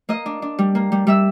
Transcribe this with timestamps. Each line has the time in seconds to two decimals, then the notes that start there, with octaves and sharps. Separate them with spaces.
0.09 A#3 D#5 D#6
0.26 D4
0.42 D4
0.59 G3
0.75 A#3
0.92 G3
1.07 G3 E5 E6